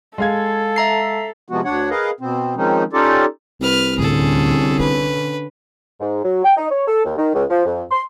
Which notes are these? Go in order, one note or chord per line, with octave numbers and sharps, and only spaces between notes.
G#3 A4 F5 G#6
E5 A#5 C7
C3 F3 G#3 B3 F#4
D2 D4 C#5 F#5
G#4 A#4 B4 D#5 F5
B2 C4
D#3 F3 G#3 C4 C#4 D#4
C#4 D#4 F4 G4 A4 D5
C2 B4 F6
D2 A2 D3 C#4 G#4 A4
D4 B4
G#2
F#3
G5
D#4
C#5
A4
D#2
D#3
C#2
F3
F2
C6